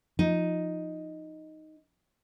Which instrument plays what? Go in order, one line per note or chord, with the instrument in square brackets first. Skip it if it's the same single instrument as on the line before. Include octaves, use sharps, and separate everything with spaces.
[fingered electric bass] F3 [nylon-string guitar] D#4